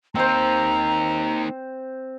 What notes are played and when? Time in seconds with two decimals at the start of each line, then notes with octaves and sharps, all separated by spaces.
0.15 A#3 C4 D#4 C5 A#5